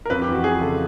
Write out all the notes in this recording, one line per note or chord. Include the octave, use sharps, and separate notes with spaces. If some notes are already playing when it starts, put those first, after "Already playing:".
A#4
F2 B4
G4
E3 F#4
F2 G#4
C#3 A4